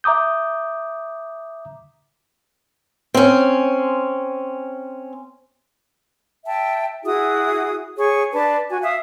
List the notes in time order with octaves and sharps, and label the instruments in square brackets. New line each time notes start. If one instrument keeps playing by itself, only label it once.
[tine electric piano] E5 A#5 D6 D#6 G6
[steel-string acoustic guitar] C4 C#4
[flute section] E5 G5 A5
E4 F#4 G#4 D#6
G#4 C#5 C#6
D4 B4 A5
F#4 G#5
E5 F5 D#6